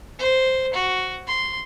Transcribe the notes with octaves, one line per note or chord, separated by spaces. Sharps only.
C5
F#4
C6